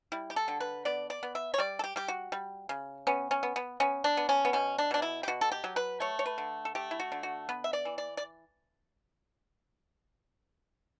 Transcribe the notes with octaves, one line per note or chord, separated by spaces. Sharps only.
G3 E4
G4
A4
D3
B4
B3 D5
D5
B3
E5
C#5
G3 D5
A4
G4
G3 G4
F#4
G3
C#3
B3 C#4
C#4
B3
B3
B3 C#4
D4
B3
C#4
B3
B2 C#4
D4
B2 D4
E4
G4
B2 F#4
A4
G4
F#3
B4
A3 C#5
C#5
B4
D3
A4
A3 G4
E4
F#4
D3
F#4
B3 B4
E5
D5
E3
D5
D5